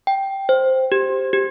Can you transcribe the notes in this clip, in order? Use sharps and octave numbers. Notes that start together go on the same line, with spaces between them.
G5
C5
G4
G4